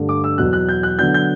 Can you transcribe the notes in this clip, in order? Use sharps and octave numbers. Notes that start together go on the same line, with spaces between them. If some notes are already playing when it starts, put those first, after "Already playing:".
Already playing: G2 D3 A3
D6
E6
E2 B2 F#3 F#6
F#6
G6
F#6
D3 F#3 B3 D4 G6
G6